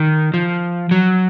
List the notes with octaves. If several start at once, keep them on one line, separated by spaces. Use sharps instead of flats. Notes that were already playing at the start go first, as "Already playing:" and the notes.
Already playing: D#3
F3
F#3